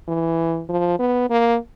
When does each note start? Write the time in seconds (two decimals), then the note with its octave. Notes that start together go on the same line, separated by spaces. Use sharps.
0.08 E3
0.69 F3
0.99 B3
1.30 A#3